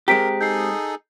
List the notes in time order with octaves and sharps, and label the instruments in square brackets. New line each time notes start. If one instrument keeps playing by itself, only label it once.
[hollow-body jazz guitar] G#3 C4 G4 [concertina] A#4 [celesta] A#5 B6 D7
[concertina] D#4 G#4 A4 [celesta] G6 C7